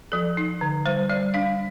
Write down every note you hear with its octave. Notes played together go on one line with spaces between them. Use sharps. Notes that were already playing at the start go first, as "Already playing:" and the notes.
F3 A4
D#4
D3
G3 C5
G3 D5
D4 F5